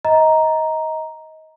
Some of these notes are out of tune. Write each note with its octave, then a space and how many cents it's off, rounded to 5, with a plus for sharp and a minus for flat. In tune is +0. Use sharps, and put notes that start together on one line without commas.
D#5 +25 A#5 +0